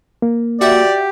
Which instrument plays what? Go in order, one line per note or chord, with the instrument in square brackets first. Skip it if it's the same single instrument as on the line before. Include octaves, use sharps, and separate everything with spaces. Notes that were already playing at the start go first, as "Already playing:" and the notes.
[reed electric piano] A#3
[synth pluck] F#4 E5 F#5 [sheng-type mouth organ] G4 [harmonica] D5